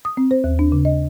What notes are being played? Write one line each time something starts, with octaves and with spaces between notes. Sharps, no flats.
D#6
C4
C5
D#2
D4
C#3
D#5